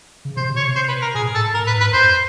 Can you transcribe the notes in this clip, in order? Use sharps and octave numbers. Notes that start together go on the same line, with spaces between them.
C#3
C3 C5
B2
C#5
C3
C5
B4
A#4
A#2 G#4
A2
A4
A2 A#4
B4
G#2
B4
F2 C5